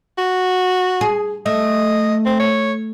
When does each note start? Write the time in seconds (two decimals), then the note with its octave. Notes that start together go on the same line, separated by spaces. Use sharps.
0.18 F#4
1.01 G#4
1.46 A3 D#5
2.25 C4
2.40 C#5